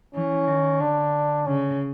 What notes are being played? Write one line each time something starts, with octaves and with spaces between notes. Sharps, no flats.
E3 C#4
D#3
D3 D4
C#3 C#4